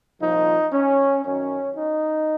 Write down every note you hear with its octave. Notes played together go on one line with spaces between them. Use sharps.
C2 A#2 F3 D#4
C#4
F#2 D#3 F#3 C#4
D#4